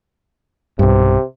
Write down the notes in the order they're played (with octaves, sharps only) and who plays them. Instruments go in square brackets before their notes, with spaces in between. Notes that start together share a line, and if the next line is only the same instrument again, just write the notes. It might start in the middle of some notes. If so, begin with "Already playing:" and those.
[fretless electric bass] B1 G2 [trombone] C3